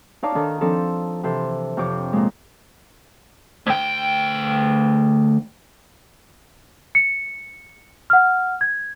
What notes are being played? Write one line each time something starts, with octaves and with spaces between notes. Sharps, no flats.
D#4 C#5 D5 F5 A5 D6
D#3 D4 D#4 A4
F3 C4 D4 D#4 A4
C3 E3 A4 C5
F2 C3 C#5 D6 G6
A#2 G#3
D2 G5
C#7
F#5 F6
G#6